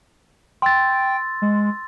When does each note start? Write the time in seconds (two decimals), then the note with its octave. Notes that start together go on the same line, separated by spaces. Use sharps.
0.62 G5 C6 E6 A6
1.42 G#3